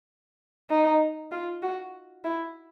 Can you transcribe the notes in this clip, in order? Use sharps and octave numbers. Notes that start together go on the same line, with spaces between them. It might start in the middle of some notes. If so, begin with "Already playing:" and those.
D#4
F4
F#4
E4